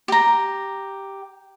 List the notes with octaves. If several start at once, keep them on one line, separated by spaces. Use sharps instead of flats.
G4 A#5